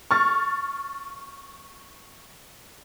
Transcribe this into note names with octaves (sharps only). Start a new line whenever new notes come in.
C#6 F6 A6